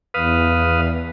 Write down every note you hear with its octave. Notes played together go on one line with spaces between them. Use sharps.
E2 B4 F5 D#6